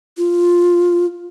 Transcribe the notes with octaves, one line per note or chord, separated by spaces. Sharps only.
F4